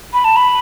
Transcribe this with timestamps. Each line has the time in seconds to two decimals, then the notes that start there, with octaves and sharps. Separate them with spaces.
0.13 B5
0.25 A5
0.36 B5